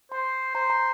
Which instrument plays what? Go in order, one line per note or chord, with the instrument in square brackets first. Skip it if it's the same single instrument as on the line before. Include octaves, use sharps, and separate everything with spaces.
[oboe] C5 [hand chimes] C6
[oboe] C5 [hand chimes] A#5
[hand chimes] A#5